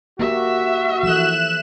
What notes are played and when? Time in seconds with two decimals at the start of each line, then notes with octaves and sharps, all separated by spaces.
0.19 A#3 F#4 G4 A#4 E5
1.03 E3 F3 A4 F#6 E7